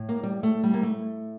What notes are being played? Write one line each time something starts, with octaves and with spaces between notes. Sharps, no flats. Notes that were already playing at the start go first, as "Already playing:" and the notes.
Already playing: A2
A#3
G3
A3
G3
A#3
A3